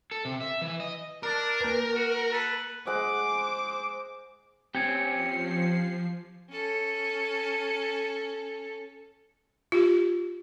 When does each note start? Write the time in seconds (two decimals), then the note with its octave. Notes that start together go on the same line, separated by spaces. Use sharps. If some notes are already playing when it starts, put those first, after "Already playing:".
0.11 A4
0.25 C3
0.41 E5
0.61 E3
0.80 D#5
1.23 D4 A#4
1.60 A#3 B4
1.93 F#4
2.31 A4 B4
2.87 G#3 C5 F#5 D6
4.75 C4 C#4 G4 G#5 C#7
5.10 F3 C7
6.50 C#4 A4
9.72 F4 G4